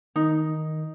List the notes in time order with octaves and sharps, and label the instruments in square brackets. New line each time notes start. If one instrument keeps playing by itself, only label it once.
[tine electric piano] D#3 [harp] D#4